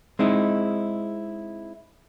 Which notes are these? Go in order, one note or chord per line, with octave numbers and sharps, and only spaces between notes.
G#3 C4 D#4 E4